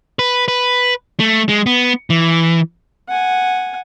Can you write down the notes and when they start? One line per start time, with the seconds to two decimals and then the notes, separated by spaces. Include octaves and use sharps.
0.19 B4
0.48 B4
1.20 A3
1.49 G#3
1.66 B3
2.10 E3
3.08 F#5 G#5